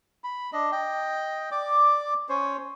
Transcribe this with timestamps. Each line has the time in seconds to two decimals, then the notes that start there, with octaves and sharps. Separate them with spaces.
0.24 B5
0.53 D4 D#5
0.72 D#5 G5
1.52 D5 D6
2.29 C#4 C5 C#5